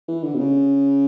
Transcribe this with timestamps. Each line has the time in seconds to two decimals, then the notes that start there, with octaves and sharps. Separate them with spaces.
0.08 E3
0.23 D3
0.34 B2
0.39 C#3